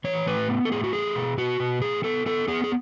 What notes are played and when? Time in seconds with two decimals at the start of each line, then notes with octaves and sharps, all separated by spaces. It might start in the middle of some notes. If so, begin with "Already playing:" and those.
0.04 E3 C#5
0.27 A2 B4
0.49 B3
0.65 A4
0.71 A2 G#4
0.84 F#4
0.93 A3 G#4
1.15 B2
1.38 B2 F#4
1.60 B2
1.82 A2 G#4
2.04 B3 A4
2.26 B3 A4
2.48 B3 G#4
2.64 G#4